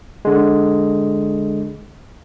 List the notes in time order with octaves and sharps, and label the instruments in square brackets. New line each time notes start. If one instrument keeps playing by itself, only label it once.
[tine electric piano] D3 G#3